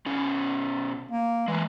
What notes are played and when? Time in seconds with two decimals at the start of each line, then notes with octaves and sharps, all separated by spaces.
0.06 B2 C#4
1.11 A#3
1.48 E3 G#3 A#3